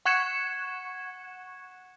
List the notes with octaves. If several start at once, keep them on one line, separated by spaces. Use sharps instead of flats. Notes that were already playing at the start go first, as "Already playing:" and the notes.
F#5 C#6 F#6 G#6 C#7 E7